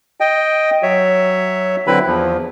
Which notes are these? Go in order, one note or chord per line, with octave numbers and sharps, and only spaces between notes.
D#5 G5
F#3 C#5 E5
D3 F#3 C4 E4 B4 B5
E2 F3